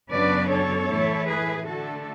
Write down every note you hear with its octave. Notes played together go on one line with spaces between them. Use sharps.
F#2 C#3 F#3 B3 D4 B4 D5
A4 C#5
A2 E3 A3 E4
G#4 B4
D3 A3 D4 F#4 A4